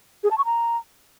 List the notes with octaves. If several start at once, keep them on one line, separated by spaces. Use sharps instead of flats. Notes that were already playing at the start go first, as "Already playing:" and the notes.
G#4
A5
C#6
A#5